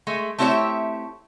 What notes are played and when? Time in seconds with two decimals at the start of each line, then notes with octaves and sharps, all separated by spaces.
0.07 G#3 A3
0.38 A3 C4 E4 G4 C#5 E5